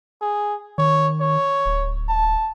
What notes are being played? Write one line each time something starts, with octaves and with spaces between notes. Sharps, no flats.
G#4
D#3 C#5
C#5
D1
A5